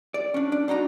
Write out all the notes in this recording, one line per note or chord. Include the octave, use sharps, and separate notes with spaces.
D5
C#4 D4
D4
D4 D#4 F#4 A#5